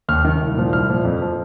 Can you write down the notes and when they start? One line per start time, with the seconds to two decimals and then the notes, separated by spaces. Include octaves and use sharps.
0.09 D#2 F6
0.25 D#3
0.41 C2
0.57 A#2 F3
0.73 C2 F6
0.89 A#2 F3
1.05 F2
1.22 F3